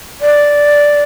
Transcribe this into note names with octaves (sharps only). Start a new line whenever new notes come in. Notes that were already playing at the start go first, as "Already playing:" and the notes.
D5